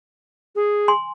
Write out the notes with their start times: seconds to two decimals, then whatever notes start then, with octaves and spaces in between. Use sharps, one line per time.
0.55 G#4
0.88 G#5 C6